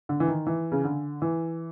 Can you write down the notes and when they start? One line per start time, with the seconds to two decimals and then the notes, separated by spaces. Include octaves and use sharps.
0.09 D3
0.20 E3
0.28 D#3
0.46 E3
0.72 C#3
0.85 D3
1.22 E3